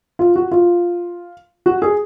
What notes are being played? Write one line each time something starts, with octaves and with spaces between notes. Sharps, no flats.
F4
F#4
F4
F#4
G#4